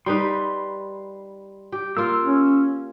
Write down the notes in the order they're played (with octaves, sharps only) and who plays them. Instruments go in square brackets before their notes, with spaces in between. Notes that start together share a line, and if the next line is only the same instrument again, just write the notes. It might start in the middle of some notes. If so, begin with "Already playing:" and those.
[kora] G3 D#4 B4 [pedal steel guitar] C6
[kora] G4
[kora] A#3 F4 [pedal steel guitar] E6
[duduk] C#4